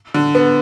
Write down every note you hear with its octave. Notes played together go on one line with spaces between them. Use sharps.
D3
B3